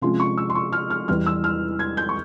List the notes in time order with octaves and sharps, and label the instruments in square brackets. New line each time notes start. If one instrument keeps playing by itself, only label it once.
[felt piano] C3 F3 G#3 C#4 F4 C6
C#6
E6
C6
C#6
F6
F6
E2 E3 G3 F6
E6
F6
G#6
G6
C#6